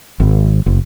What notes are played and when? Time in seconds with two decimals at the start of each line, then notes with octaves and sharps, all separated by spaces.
0.20 G#1
0.66 F#1